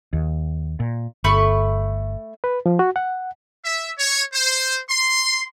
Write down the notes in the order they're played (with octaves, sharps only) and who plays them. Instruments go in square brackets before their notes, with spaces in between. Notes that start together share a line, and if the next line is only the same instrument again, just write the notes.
[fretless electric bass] D#2
A#2
[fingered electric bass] G1 [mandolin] A3 B5 C#6
[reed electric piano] B4
F3
F#4
F#5
[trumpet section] E5
C#5
C5
C6